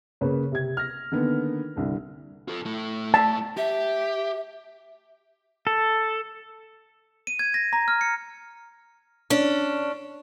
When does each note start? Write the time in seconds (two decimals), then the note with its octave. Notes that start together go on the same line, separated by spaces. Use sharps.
0.21 C#3 A#3 B4 C#5
0.52 C3 G#6
0.77 F6 A#6
1.12 D3 D#3 A#3 B3
1.76 C2 D3 D4
2.48 F4 A4
2.65 A2 A3
3.14 A5
3.57 G4 E5
5.67 A4
7.27 D#7
7.39 G#6
7.54 A#6
7.73 A#5
7.88 F6
8.01 C#7
9.30 C#4 D4